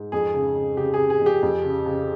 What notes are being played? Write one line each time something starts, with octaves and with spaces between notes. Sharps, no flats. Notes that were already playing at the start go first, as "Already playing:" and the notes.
Already playing: G#2
F2 G#4
C#3
C#3
C#3 G4
G#4
C#3
G#4
F2
G4
F2
C#3
C#3